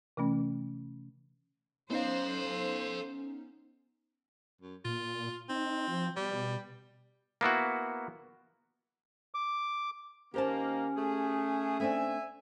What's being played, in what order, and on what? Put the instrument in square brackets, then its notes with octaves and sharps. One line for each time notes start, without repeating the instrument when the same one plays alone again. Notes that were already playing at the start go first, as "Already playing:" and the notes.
[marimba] C3 E3 A3 C#4
[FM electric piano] B3 C#4 D#4 [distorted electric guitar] A4 F5 [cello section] C5
[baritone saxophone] F#2
[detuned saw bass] A#2 [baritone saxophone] F4
[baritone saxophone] C4 [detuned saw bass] D#4
[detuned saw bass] F3
[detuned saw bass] B2 [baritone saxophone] G3
[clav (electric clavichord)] A#3 B3 E4 F#4
[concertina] D6
[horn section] D#3 A#3 [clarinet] C#4 [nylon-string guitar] G4 C5 A5
[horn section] A3 G#4
[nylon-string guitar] A3 C4 D4 [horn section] E5 G#5